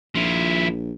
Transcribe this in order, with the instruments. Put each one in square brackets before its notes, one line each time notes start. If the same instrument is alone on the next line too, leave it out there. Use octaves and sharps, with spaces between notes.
[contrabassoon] A#1 [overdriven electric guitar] F3 E4